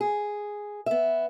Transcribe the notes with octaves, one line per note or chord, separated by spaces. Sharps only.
G#4
B3 E5